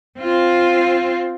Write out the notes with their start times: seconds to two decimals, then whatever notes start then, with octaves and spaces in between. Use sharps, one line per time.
0.19 C4 F4